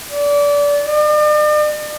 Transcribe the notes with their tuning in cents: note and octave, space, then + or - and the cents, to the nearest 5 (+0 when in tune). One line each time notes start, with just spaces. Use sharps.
D5 -25
D5 +45